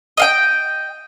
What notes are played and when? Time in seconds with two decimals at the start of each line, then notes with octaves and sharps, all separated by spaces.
0.17 D#5 F5 G5